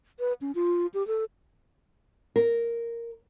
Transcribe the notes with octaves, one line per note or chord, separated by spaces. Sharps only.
B4
C#4
F4
G4
A4
A#4